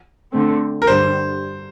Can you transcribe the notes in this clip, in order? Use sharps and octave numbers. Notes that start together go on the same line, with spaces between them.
D3 A3 C4
A#4
G2 D3 G3 C5